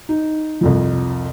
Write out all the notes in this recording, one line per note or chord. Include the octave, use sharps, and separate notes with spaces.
D#4
C2 F2 F3